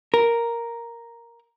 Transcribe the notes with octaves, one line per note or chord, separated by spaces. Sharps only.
A#4